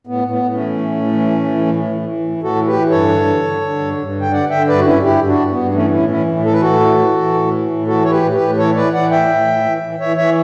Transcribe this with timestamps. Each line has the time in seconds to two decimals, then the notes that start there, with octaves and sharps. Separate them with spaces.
0.07 A2 B3
0.25 A2
0.30 B3
0.43 A2
0.54 A3 C#4
0.60 E3
0.78 A2
0.95 A2
1.13 E3
1.30 A2
1.49 E3
1.66 A2
1.84 E3
2.02 E3
2.20 A2
2.37 A2
2.43 F#4 A4
2.55 E3
2.67 G4 B4
2.73 E3
2.90 G2 A4 C#5
3.08 D3
3.25 D3
3.43 D3
3.61 D3
3.79 G2
3.97 G2
4.15 D3
4.21 G5
4.32 D3 D5 F#5
4.50 D3 E5 G5
4.68 G2 B4 D5
4.79 F#4
4.86 G2 C#4 E4
5.03 G2 E4 G4
5.21 G2
5.27 D4 F#4
5.39 G2
5.51 B3
5.57 G2
5.74 E3 A3 C#4
5.91 A2 C#4 E4
6.09 E3 C#4 E4
6.28 A2
6.45 E3 A4
6.53 B4
6.61 A2 F#4 A4
6.81 E3
6.99 E3
7.16 E3
7.34 A2
7.51 E3
7.69 A2
7.87 E3 F#4 A4
8.04 A2 C#5
8.11 G4 B4
8.23 A2
8.34 G4 B4
8.41 A2
8.58 E3 A4 C#5
8.75 E3 B4 D5
8.94 E3 D5 F#5
9.11 A2 E5 G5
9.29 A2
9.47 E3
9.64 E3
9.82 E3
10.00 E3 C#5 E5
10.17 E3 C#5 E5